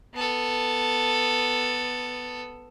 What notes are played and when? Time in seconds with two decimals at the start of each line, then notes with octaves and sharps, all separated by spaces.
0.15 B3 A4